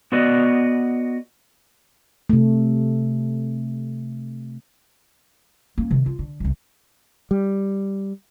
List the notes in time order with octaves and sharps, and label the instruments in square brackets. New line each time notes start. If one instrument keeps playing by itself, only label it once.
[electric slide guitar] B3 F#4 B4 D5 D#5
[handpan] C3 A3
[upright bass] A#3 C#4
C3 D#3
F4
D3
E1 C2
[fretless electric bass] G3